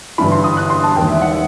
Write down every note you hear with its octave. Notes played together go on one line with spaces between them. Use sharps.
G1 G2 E3 B5
C6
D#6
F#6
C6
A5
E1 D#2 D#3 G5
E5
F#5